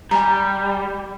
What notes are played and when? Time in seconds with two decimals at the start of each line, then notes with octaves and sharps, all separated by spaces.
0.11 G3 G#5 A#5